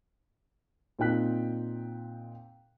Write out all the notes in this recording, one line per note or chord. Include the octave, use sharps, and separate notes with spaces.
A#2 C4 D#4 G5 F#6 B6